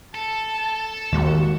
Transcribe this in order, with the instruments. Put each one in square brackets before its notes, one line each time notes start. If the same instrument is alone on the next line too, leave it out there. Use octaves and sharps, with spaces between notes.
[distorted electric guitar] A4 [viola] A5
[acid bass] D#2 [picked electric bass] D#3 G#3 [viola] F#4